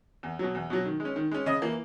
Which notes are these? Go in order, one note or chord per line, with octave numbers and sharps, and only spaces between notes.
E2
B2 F#3
E2
B2 F#3
D#3
G#3
C#4
D#3
G#3 C#4
C#3 D#5 D#6
E3 A#3